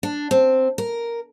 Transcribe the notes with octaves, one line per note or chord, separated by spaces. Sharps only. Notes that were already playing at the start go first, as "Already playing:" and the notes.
D4
C4
A#4